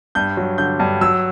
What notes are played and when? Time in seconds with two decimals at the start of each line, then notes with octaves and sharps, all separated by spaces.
0.15 G2 G6
0.37 F#3
0.58 D3 G6
0.79 G2
1.01 F#3 E6